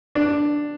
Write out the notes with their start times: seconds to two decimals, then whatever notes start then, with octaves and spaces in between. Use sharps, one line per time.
0.15 D4